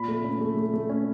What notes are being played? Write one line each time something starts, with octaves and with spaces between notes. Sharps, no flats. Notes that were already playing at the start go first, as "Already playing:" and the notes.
Already playing: A#2 B5
A3
C#4
A3
A3
A3
C#4